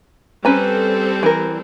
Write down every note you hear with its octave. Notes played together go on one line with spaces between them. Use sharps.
G3 C4 C#4 A4 B4 A#5
E3 A#4